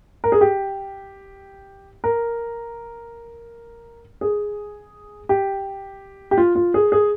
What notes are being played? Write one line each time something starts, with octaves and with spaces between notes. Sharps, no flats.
A#4
G#4
G4
A#4
G#4
G4
G4
F4
F4
G#4
G#4